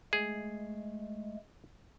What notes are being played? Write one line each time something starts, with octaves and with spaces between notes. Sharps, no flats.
G#3 A3 G#4